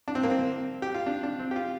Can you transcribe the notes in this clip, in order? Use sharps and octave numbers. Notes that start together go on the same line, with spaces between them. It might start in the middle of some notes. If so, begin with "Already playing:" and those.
D4
C4
A#3
C4
G4
F4
D4
D4
C4
G4
F4